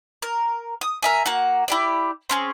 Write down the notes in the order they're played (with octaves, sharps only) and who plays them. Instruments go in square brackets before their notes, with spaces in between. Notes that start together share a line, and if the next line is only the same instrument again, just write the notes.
[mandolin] A#4
D#6
A#4 E5 G#5
A#3 F#4 F#5
E4 G4 D5
C4 C#4 G#4